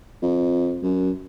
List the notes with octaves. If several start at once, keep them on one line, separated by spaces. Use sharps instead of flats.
F2
F#2